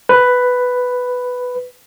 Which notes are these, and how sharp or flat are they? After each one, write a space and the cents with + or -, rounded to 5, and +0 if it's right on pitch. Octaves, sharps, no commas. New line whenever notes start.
B4 +5